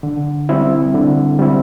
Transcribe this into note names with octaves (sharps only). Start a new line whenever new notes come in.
D3
G3 C4 E4
D3
G3 C4 E4